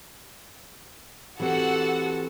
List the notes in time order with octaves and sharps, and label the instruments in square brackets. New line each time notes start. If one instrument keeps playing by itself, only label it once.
[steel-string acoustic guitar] E3 C4 [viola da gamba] F#4 A4 [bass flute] G4 [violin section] F#5